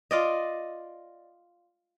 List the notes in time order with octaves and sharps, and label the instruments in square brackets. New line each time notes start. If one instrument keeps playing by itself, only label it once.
[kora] F4 D5 D#5